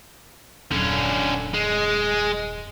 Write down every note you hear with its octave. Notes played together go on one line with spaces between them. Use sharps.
D#1 F#2 D3 C#4
G#3